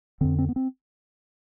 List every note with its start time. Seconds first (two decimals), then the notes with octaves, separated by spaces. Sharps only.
0.21 F2 D3 C4
0.39 C4
0.49 B3
0.56 C4